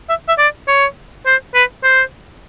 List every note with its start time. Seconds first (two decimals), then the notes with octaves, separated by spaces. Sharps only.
0.09 E5
0.28 E5
0.38 D5
0.68 C#5
1.26 C5
1.54 B4
1.84 C5